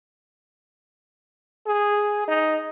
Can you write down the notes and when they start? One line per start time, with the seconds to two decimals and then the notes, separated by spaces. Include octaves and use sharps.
1.67 G#4
2.28 D#4